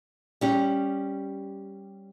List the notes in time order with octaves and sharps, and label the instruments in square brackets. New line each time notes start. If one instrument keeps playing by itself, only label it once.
[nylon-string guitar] G3 C#4 G4